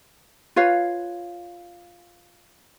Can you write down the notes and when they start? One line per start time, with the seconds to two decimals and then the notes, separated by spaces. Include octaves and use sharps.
0.56 F4 B4 C#5 F5